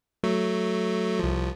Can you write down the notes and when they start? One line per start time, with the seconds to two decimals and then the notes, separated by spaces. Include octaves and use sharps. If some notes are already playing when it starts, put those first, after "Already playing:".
0.23 F#3 A3
1.19 C2 F3